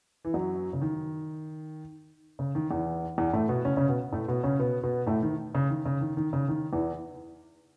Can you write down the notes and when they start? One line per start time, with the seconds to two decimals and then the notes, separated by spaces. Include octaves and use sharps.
0.25 E3
0.34 F#2 F#3
0.73 C#3
0.82 D#3
2.39 C#3
2.55 D#3
2.70 E2 E3
3.18 E2 E3
3.33 A2 A3
3.49 B2 B3
3.65 C#3 C#4
3.76 C#3 C#4
3.88 B2 B3
4.12 A2 A3
4.28 B2 B3
4.44 C#3 C#4
4.59 B2 B3
4.84 B2 B3
5.06 A2 A3
5.23 D#3
5.55 C#3
5.70 D#3
5.86 C#3
6.01 D#3
6.17 D#3
6.33 C#3
6.49 D#3
6.73 E2 E3